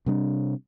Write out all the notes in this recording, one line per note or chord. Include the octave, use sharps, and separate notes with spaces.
C3 G3 D4